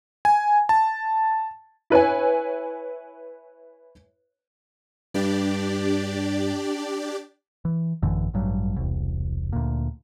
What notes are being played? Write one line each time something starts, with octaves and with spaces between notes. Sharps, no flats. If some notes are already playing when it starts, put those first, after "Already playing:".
G#5
A5
E4 B4 C#5 G#5
G2 D4 G4 D5
E3
A1 F#2 D3 E3
A1 G2 F#3
E1 C2
D2 A#2